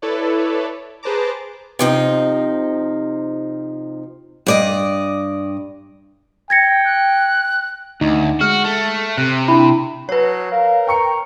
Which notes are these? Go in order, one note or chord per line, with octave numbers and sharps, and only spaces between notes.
E4 A4 B4 C#5 D5
G#4 B4 C5 A5 A#5 D6
C3 F3 D#4
G2 D5 D#5
G5 G#6 A#6 C#7
F#6
D2 D#4
G#3 F#4 F6
A3
C3 F#6
D4 E4 B5
F#3 B4 C#5
A#4 F5
G5 A#5 C#6 C#7